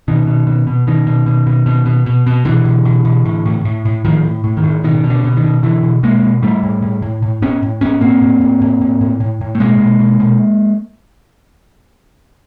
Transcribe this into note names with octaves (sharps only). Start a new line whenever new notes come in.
B2 D#3
B2
B2
B2
B2 D#3
B2
B2
B2
B2
B2
B2
B2
B2 D3 E3
B2
B2
B2
A2
A2
A2
A2
A2 D#3 F3
A2
A2
D#3
A2
B2 D#3
B2
D3
B2
D#3
B2
B2 D3 E3
B2
B2 G#3 A#3
B2
A2 G3 A3
A2
A2
A2
A2
A2 B3 C#4
A2
A2 B3 C#4
A2 A#3 C4
A2
A2
A2
A2
A2
A2
A2
A3
B2 G#3 A#3
B2
B2
B2